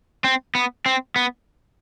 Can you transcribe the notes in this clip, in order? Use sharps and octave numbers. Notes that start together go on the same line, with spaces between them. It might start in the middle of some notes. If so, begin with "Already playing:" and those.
C4
B3
C4
B3